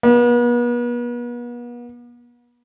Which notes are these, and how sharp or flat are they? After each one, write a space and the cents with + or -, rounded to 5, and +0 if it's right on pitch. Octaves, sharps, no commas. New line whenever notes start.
B3 -40